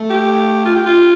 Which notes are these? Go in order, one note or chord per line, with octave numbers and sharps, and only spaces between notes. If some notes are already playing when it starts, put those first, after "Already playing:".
Already playing: A3
G4
F4
G4
F4